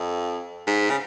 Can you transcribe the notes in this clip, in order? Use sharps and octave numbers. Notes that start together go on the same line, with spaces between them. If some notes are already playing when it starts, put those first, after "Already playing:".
Already playing: F2
G#2
C#3